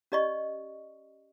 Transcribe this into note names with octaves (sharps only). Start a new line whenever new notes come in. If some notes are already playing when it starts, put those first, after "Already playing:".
C#4 G4 D5 D#5 C#6